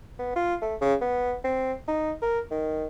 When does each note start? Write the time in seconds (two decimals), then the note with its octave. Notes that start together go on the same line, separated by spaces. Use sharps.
0.19 B3
0.36 F4
0.62 A3
0.81 C#3
1.01 B3
1.44 C4
1.88 D#4
2.22 A#4
2.51 D#3